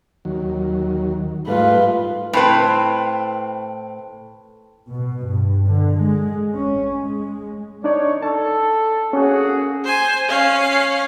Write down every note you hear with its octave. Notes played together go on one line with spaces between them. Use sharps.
D#2 F#3
G#2 G3 A3 F4 B4
A2 C4 B4
B2
G2
D3
G#3
C#4
G#3
D4 D#4 C#5 D5
A4 A5
A#3 C#4 F#4 G#4
C5 G#5
C#4 F5